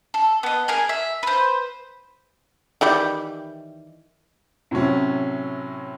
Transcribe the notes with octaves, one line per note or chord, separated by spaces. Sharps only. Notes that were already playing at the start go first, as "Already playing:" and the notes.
A4
B3 D#5
G#4 A#4 G#5
E5
B4 C5
D#3 E3 G3
A2 C3 F#3 C#4